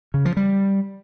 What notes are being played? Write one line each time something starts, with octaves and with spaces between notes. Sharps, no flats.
C#3
F3
G3